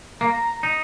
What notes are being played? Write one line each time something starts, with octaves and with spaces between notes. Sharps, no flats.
A#3 A#5
D#4